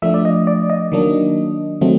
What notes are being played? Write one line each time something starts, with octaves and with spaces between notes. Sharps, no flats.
F3 A3 D4 E5
D5
D#5
D5
D#5
D#3 F#3 A#3 D4
D#3 F#3 A3 C4